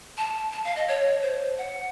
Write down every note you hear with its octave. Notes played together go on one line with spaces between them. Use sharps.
A5
A5
F5
D#5
C#5
C5
F#5